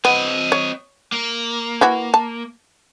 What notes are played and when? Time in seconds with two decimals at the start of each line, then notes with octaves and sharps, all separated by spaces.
0.05 B3 C4 D#5
0.52 C#5
1.12 A#3
1.81 E3 E4 F#4
2.14 A5